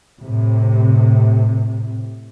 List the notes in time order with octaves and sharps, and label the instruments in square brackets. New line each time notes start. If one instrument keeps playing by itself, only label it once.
[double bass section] A2 C3